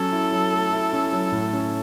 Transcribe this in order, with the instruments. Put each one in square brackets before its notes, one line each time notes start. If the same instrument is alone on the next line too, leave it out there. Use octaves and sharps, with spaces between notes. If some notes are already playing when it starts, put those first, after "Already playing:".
Already playing: [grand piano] F#3 C#4 [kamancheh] A4
[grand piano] E4
F#3
A3
E4
C#4
F#3
A2
C#4